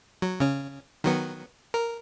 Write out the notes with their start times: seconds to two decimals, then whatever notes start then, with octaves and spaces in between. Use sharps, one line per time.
0.22 F#3
0.40 C#3 C#4
1.04 D#3 F#3 B3
1.74 A#4